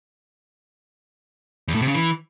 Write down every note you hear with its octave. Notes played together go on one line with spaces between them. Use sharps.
E2
A2
C3
C#3
E3